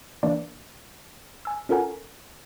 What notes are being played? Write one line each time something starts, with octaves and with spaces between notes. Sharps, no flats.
E3 A#3 D4 D5
G#5 E6
C#4 F4 A4 A#4 F#5 G#5